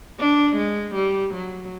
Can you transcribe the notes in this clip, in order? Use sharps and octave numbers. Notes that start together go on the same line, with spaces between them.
D4
G#3
G3
F#3